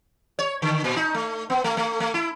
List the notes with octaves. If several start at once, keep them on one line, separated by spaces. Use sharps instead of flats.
C#5
D3
A#2
D#4
A3
B3
A3
A3
A3
E4